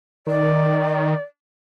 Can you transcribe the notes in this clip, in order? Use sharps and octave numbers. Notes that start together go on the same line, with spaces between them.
D#3 D5